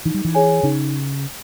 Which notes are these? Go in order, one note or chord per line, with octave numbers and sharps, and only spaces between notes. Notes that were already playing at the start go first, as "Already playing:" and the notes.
E3 D#4
G3
E3
G#4 C#5 G#5
C#3 D#4